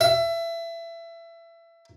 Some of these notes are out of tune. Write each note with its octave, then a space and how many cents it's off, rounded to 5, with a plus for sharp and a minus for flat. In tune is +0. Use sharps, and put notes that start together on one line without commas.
E5 +25